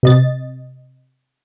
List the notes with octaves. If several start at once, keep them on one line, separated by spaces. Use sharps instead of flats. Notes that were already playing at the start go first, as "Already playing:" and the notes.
C3 D#5 A6